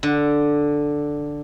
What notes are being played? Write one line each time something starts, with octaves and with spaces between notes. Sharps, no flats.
D3